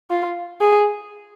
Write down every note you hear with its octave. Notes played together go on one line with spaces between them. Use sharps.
F4
G#4